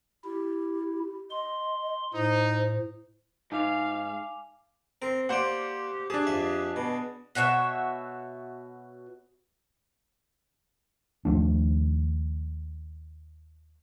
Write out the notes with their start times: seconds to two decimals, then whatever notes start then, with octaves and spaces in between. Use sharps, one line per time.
0.25 E4 G4
1.31 D#5 C6
2.14 A2 D#4 C5
3.52 G#2 D#4 F5 G#5 D6 F7
5.02 C4 A#4
5.29 A#3 G4 C5 D5 F#5
6.10 D4 G4 G#4 A5
6.27 F2 E5
6.76 B2 B4
7.35 B2 F#4 C#5 E5
11.25 D#2 F3 A3 D4